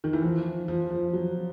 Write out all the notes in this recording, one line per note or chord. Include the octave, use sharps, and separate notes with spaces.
D#3
E3
F3
F3
F3
F#3